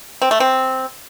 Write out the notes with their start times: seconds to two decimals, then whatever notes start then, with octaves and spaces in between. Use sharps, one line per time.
0.22 C4
0.31 A3
0.40 C4